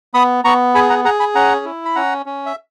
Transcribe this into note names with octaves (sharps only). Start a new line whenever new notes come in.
B3 B5 D#6
B3 A#5 C#6
G#4 G#5 B5
F#5 A#5
G#4 F#5 A#5
G#5 B5
C#4 F#5 A#5
E4
B5
C#4 F#5 A#5
C#4
E5